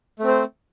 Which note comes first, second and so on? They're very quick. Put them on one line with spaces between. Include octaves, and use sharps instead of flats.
A3 C4 C5